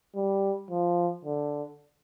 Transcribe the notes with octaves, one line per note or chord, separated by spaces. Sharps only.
G3
F3
D3